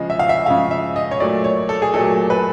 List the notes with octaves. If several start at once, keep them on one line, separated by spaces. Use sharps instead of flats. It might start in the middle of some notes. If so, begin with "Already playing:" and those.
Already playing: C#3 F3 G#3 D#5
E5
F5
E5
C#3 F3 G#3 F5
E5
D#5
C#5
A#2 F#3 A3 D5
C#5
A4
G#4
A#2 F#3 A3 A4
B4